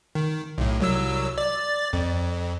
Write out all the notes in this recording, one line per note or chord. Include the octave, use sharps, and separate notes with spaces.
D#3
B1 A2
C2 F#3 E6
D5 A6
F2